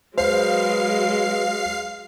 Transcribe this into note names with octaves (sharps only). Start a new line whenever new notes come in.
F#3 G#3 B4 C5 F5 C7